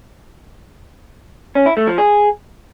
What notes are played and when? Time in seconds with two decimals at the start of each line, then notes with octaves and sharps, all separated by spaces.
1.55 C#4
1.66 E4
1.77 A3
1.87 F3
1.98 G#4